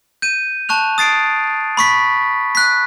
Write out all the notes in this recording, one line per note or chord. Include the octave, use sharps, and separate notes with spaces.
G6 D#7
A5 C#6 F#6 F7
D#6 A6 C7 D7
B5 C#6 B6
F#6 B6